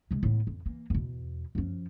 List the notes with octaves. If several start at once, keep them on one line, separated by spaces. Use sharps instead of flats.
C3 G#3
A2 B3
F2
E3 A#3
E2 B2
F#2 F3